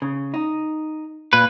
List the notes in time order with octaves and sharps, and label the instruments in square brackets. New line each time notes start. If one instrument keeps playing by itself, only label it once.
[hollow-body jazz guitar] C#3
D#4
[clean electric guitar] A#2 B4